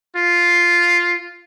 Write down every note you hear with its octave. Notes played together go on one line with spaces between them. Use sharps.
F4